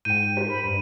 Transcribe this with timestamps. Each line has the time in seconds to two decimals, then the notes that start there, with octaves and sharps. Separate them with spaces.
0.05 G#2 G5 G6 D#7
0.37 G4 A#4 C5
0.49 B5
0.64 G2